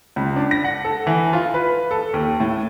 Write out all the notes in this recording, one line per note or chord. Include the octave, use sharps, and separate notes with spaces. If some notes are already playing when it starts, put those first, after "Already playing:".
C#2
D4
A#6
F#5
A4
E3
F4
B4
A4
D#2
A2